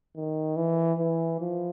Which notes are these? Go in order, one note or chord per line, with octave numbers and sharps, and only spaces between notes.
D#3
E3
E3
F3